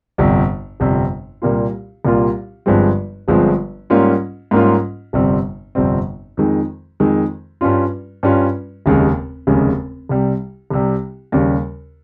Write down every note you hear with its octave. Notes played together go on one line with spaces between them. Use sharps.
G1 F2 C3 G3
G1 F2 C3 G3
C2 A#2 G3 A#3 F4
C2 A#2 G3 A#3 F4
G1 G2 F3 G#3 C4
G1 G2 F3 G#3 C4
G#2 G3 A#3 C#4 F4
G#2 G3 A#3 C#4 F4
G1 F2 C3 G3 C4
G1 F2 C3 G3 C4
F2 D#3 G#3
F2 D#3 G#3
G2 G3 C#4 F4
G2 G3 C#4 F4
F1 D#2 C#3 G#3
F1 D#2 C#3 G#3
C2 C3 G3
C2 C3 G3
D#2 C#3 G3